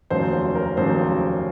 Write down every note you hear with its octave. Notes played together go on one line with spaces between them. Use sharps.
F1 D#2 C#3 F#3 C5
C5
A#4
F1 D#2 C#3 F#3 C5